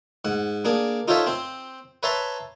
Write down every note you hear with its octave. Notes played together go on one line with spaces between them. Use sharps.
G#2 F#5
A#3 D4 G#4
D#4 F4 A4 C5 C#5 E5
C4 C5
B4 C#5 E5 A5 A#5 C6